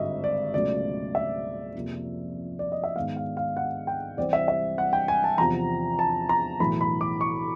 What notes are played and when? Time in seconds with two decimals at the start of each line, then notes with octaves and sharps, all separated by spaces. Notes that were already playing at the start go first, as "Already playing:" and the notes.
Already playing: G#1 G2 D3 D#5 E5
0.24 D5
0.54 C#2 B2 F#3 A3 C#4 D5
1.15 E5
1.75 F2 C3 F3 A#3
2.59 D5
2.72 D#5
2.84 E5
2.96 G#2 D#3 G#3 B3 F5
3.16 F5
3.37 F5
3.57 F#5
3.87 G5
4.17 C2 C3 E3 G3 C4 D5
4.33 E5
4.48 E5
4.78 F#5
4.93 G5
5.08 G#5
5.24 A5
5.38 E2 C3 F3 A#5
5.99 A5
6.29 A#5
6.60 B1 A2 E3 B5
6.81 B5
7.01 D6
7.21 C#6